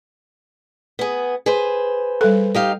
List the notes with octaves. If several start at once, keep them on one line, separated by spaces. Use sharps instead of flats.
B3 G#4
G#4 B4 C5
G3 A4
D#4 G4 F5